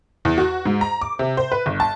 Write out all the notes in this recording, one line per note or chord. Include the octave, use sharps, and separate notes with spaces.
E2
F#4
G#2
A#5
D6
C3
C5
B4
G1
A5